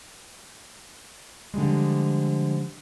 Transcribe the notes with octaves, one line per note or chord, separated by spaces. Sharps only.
D3 F3 G3 G#3